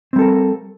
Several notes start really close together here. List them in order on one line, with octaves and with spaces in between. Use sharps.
C4 G3 A4 A#4